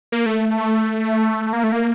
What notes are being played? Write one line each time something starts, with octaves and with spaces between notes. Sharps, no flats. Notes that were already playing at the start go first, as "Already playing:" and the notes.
A#3
A3
A#3
A3
A#3